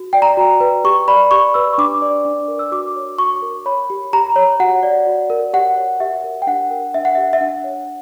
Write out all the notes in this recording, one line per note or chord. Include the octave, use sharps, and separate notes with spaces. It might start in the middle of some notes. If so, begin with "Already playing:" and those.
Already playing: F#4
D5 G5
A#5
F#4
B4
G4 C#6
D5 B5
G4 C#6
B4 E6
C#6
D4 D6
D5
D4
A#4
E6
F#4 D6
C#5
F#4 C#6
A#4
C#5 B5
G4
G4 A#5
C#5
F#4 F#5
D5
F#4
A#4
G4 F#5
C#5
G4 E5
A#4
G5
D4 F#5
A#4
D4 E5
F#5
G4 E5
E5
D4 F#5
C#5